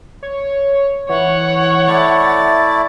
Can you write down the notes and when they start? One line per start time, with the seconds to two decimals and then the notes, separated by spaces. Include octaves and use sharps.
0.23 C#5
1.09 E3 C#5 F#5
1.88 A3 E4 D5 A6